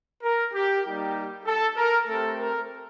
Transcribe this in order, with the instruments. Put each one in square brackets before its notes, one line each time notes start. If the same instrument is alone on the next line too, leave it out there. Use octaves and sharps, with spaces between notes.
[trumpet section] A#4
G4
G3 A#3 D#4 G4
A4
A#4
A3 C4 G4 A4
A#4